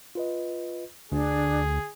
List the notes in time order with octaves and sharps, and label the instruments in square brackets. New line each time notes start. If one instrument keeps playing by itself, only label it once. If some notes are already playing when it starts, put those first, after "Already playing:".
[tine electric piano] F4 B4 D#5
[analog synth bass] D2 [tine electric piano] D3 [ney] D4 [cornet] G#4